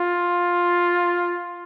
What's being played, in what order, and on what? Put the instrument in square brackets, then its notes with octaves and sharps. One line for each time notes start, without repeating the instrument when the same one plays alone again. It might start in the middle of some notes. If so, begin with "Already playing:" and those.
Already playing: [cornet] F4